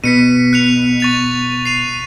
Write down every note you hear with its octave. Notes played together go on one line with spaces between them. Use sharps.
B2 B6 C#7 D#7
F#6 C#7 F7
C#6 A6 F7
C7 D#7 F7